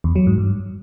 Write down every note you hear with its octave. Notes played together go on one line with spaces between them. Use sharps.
E2
F#3
G#2
G2